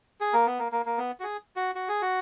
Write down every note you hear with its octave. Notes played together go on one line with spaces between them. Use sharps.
G#4
A#3
B3
A#3
A#3
A#3
B3
F#4
G#4
F#4
F#4
G#4
F#4